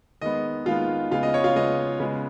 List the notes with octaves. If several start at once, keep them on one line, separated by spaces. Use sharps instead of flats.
D#3 G#3 B3 D#5
D#3 G#3 B3 F4 F5
C#3 G#3 B3 F4 F5
D#5
C#5
F4 F5
C#3 G#3 B3 D#5
C#3 G#3 B3